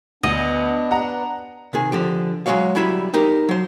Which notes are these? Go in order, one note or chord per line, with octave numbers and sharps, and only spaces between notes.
D2 B3 D4 D#5
F#5 A#5
C3 D#3 G#4
D3 F3 G4
F#3 G#3 A#3 F#4 C#5 F5
F#3 G3 E4 E5 B5
D#4 G4 A#4
F#3 C5